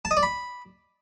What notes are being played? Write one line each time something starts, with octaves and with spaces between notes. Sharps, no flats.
A5
D#5
D5
B5